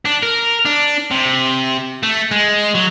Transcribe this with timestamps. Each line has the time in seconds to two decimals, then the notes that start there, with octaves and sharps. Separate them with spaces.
0.05 D4
0.23 A#4
0.65 D4
1.11 C3
2.03 A3
2.31 G#3
2.75 F#3